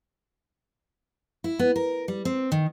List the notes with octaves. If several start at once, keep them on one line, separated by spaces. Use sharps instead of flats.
E4
B3
A#4
G3
C4
D#3